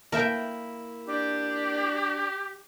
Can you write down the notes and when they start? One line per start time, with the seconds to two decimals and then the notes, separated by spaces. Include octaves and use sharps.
0.12 A#3 E4 A#4 E5 G5
1.07 D4 G4